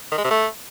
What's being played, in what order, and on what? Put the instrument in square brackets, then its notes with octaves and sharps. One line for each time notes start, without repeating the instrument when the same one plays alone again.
[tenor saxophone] D#3
G#3
C3
A3